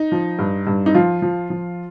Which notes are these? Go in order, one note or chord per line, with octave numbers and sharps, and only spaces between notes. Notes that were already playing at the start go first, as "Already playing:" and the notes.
Already playing: D#4
F3
G2
G2
D#4
F3 F4
F3
F3